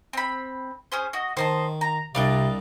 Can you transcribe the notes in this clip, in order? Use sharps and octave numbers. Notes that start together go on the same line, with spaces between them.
C4 B5
C#4 G#4 C5
F#4 D#5
D#3 C5 D#5 A5
A#5
C2 C3 G3 D4 D5 D#5 F5